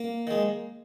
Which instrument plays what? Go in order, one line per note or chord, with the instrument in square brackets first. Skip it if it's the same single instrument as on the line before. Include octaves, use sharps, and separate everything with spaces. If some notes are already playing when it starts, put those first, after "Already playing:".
Already playing: [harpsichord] A#3
D#3 G#3